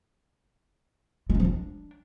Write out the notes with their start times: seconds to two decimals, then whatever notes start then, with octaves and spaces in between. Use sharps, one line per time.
1.30 G#3
1.35 C#4
1.40 F3
1.45 D4